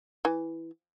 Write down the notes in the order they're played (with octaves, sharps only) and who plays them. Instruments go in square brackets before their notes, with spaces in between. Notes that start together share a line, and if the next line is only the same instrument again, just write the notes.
[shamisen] E3